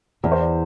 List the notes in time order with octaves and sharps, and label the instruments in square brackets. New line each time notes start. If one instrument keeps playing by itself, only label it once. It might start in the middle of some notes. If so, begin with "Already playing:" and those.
[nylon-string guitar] E2 [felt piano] D5
[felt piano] C5
D5